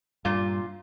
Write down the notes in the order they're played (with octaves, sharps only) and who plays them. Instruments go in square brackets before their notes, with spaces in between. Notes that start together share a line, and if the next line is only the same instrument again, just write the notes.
[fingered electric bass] G2 [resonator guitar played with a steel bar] A#2 F4